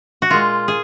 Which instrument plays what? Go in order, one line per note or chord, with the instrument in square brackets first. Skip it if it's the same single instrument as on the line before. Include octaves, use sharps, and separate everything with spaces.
[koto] F#4
A#2 G#3 F4
G#4